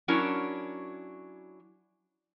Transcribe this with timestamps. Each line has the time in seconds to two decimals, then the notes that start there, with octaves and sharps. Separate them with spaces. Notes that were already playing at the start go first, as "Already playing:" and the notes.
0.08 F#3 C#4 D4 E4 A#4